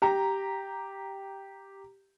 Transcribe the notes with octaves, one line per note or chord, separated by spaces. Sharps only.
G4 A#5